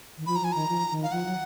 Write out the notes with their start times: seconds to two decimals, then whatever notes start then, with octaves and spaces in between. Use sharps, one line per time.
0.18 D#3
0.26 F3 B5
0.36 A#5
0.41 F3 G#5
0.52 D#3 A#5
0.69 F3
0.91 D#3
1.03 F5
1.12 F3 F#5
1.26 F#3